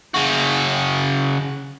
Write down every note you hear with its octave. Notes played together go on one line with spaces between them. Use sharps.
C#3 F#4